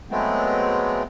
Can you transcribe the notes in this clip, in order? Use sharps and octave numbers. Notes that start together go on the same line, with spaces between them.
F#3 G#3 A3 B3 C4